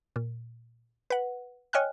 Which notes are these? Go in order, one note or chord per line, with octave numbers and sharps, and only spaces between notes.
A#2
B4 F#5
C#5 D#5 G5 G#5 F6 F#6